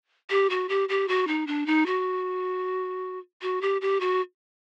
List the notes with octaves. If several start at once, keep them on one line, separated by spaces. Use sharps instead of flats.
G4
F#4
G4
G4
F#4
D#4
D4
D#4
F#4
F#4
G4
G4
F#4